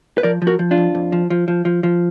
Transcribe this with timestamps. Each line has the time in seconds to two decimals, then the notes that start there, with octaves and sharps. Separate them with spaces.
0.18 B4
0.23 F3 A#4 D5
0.42 F3
0.47 F#4 A#4
0.59 F3
0.71 D4 F4
0.77 F2
0.95 F2
1.12 F3
1.30 F3
1.48 F3
1.65 F3
1.83 F3